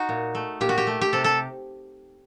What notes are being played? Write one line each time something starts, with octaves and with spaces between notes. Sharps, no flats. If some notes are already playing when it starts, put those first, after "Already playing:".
Already playing: D#4 F#4
A#2
A3
A#2 G4
F#4
G4
A3
G4
C3 A4
A4